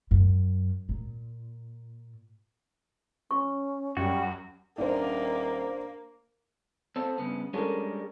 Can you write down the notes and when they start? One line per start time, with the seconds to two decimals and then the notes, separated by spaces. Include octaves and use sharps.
0.11 F#2
0.89 A#2
3.31 C#4 C#6
3.97 F#2 G3 F#4
4.78 D#1 A#3 D4 C5
6.96 C4 A4
7.18 G2 C#3 B3
7.53 G3 G#3 C#4 D4 A4 A#4